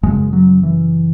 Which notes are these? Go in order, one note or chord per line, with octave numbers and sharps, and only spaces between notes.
F#2 C#3 G#3
F#3
E3